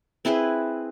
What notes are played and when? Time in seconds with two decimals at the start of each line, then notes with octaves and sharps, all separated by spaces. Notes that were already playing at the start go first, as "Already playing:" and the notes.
0.25 C4 E4 G#4 B4